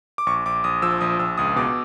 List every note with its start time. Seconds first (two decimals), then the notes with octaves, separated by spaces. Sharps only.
0.18 D6
0.26 A#1 C#6
0.45 A#1 D6
0.64 A#1 D#6
0.82 F3 E6
1.01 A#1 D#6
1.19 A#1 E6
1.38 C#2 D#6
1.56 B2 D6